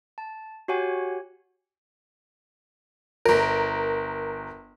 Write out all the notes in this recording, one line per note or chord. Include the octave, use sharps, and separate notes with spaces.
A5
F#4 G4 C#5 F#5 G#5
G1 A#4